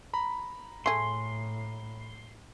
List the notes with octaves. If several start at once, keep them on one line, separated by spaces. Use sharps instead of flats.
A#5 B5
A2 A3 G#4 C6